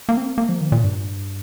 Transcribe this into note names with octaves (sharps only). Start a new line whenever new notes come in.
A#3
C4
A#3
F3
D#3
A#2
G2